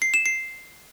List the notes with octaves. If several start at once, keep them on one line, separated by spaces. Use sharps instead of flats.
C7
E7
C7